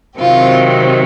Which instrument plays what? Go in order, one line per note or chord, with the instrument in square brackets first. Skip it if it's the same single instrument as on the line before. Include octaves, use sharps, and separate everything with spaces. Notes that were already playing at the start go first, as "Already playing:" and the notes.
[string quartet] C3 D#3 F#3 C4 F4